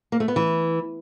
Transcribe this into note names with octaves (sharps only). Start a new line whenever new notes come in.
A#3
A3
B3
E3